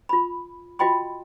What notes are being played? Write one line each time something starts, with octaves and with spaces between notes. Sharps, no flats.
F4 B5
F4 F#4 D#5 G5 B5 C6